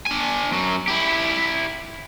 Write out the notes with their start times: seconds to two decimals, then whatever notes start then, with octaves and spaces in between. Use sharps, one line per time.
0.06 D4 G#5
0.52 F#2 F#3
0.88 E4 G4